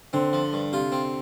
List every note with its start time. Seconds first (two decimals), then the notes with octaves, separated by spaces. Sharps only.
0.13 D3 C4
0.33 F3
0.53 G2
0.73 C3 F4
0.92 C4